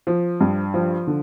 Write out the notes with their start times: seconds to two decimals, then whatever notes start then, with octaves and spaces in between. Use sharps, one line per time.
0.07 F3
0.41 G2
0.74 F3
1.07 D3